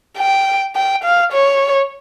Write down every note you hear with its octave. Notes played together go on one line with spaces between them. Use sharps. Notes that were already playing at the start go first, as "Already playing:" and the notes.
G5
G5
F5
C#5